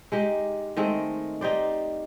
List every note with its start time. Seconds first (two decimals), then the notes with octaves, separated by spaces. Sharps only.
0.12 G#3 D#4 G4
0.77 D#3 G#3 A3 C4
1.41 D#4 G4 C5 D5